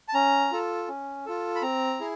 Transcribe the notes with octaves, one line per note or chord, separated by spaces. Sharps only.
A5
C#4 A#5
F4 A4
C#4
F4 A4
B5
C4 A#5
E4 G#4